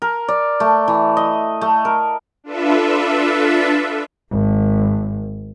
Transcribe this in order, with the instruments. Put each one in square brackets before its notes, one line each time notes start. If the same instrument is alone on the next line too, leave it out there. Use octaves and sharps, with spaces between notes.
[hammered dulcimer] A#4
D5
A3
E3
D#5
A3
A#4
[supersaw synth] D4 F4 A4 B4 E5
[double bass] G#1